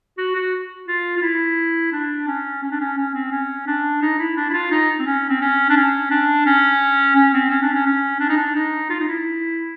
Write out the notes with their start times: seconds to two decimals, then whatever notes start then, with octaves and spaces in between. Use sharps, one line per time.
0.18 F#4
0.35 F#4
0.88 F4
1.17 F4
1.22 E4
1.92 D4
2.27 C#4
2.63 C#4
2.71 D4
2.81 C#4
2.97 C#4
3.14 C4
3.31 C#4
3.67 D4
4.02 D#4
4.19 E4
4.37 D4
4.49 E4
4.53 F4
4.71 D#4
4.99 C4
5.06 C#4
5.29 C4
5.41 C#4
5.70 D4
5.77 C#4
6.11 D4
6.46 C#4
7.16 C#4
7.33 C4
7.51 C#4
7.62 D4
7.74 C#4
7.86 C#4
8.20 D4
8.29 D#4
8.36 D4
8.55 D#4
8.90 F4
9.00 D#4
9.08 E4